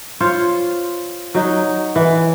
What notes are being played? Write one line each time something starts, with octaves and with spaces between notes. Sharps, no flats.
F4 C5 C#5
F#3 D#4
E3